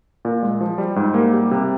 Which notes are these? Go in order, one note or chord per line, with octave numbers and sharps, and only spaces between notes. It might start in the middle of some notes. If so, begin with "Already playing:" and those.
A#2
G#3
F3
G3
G#2
A#3
G3
C3